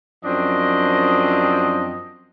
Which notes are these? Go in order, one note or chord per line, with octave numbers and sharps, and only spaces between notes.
F#2 F3 C4 D4 D#5